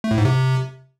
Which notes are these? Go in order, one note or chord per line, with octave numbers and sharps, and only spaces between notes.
A3
A2
G#2
C3